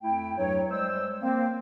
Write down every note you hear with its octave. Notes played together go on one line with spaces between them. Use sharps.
F2 A3 E4 G5
E2 G2 F#3 A3 C#5
G3 G#3 C5 E6
A#3 C4